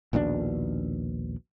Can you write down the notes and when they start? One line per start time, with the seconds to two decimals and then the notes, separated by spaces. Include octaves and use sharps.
0.13 A#1 D#2 B2 D4